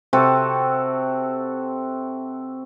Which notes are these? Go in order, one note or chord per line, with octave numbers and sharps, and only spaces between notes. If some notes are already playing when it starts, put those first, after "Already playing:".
C3 C4 F#4 A4